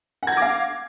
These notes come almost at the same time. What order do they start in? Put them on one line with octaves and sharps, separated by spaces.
F#5 G#6 A#6 D6 F5